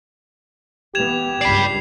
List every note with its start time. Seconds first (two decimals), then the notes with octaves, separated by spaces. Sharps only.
0.95 E3 B3 G4 G#6 E7 F7
1.41 C#2 G2 D5 B5 C7